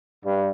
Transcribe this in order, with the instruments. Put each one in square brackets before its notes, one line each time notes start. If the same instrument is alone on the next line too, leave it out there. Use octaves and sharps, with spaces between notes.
[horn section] G2